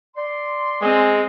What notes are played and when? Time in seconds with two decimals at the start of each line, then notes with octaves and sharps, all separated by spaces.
0.16 D5 C6
0.82 G#3 C4 G#5